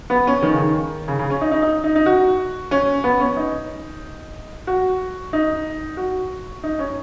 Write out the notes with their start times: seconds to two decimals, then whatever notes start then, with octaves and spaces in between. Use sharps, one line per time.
0.10 B3
0.27 C#4
0.42 D#3
0.53 C#3
0.62 D#3
1.08 C#3
1.19 C#3
1.30 C#4
1.41 D#4
1.51 D#4
1.62 D#4
1.84 D#4
1.95 D#4
2.06 F#4
2.71 C#4
3.04 B3
3.20 C#4
3.37 D#4
4.67 F#4
5.33 D#4
5.97 F#4
6.63 D#4
6.79 C#4